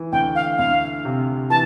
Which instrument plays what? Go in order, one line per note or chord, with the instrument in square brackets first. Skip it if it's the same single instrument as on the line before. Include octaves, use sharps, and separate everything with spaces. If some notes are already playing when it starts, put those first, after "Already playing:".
Already playing: [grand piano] E3
[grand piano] D2 [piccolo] G5
[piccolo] F5
[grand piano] D2 [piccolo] F5
[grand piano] C3
[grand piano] E3 [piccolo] A5